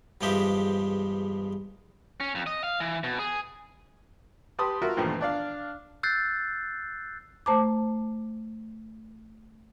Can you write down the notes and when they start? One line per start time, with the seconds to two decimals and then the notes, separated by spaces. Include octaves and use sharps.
0.21 E2 G2 F3 G#3 G4 E5
2.20 C#4
2.35 F2
2.46 D#5
2.64 F5
2.80 E3
3.04 B2
3.19 G#4
4.59 G4 B4 A5 B5 C6 D#6
4.82 F4 F#4 A#4 E5
4.97 E2 G2 A#2 D#3 F3 A3
5.20 D4 D5 F5
6.03 E6 F#6 G6 A6 C7
7.46 A3 C5 A5 A#5 D6